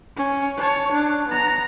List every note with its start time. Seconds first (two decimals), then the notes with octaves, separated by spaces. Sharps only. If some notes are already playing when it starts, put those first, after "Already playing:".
0.17 C#4
0.57 C#5 A5
0.92 D4
1.28 B3 A#5